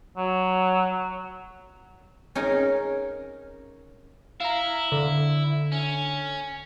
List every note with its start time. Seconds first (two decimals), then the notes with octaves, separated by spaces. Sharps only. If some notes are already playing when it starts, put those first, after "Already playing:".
0.17 F#3
2.35 C#4 D#4 G#4 A#4
4.40 E4 F5 A#5
4.92 D3
5.72 C#4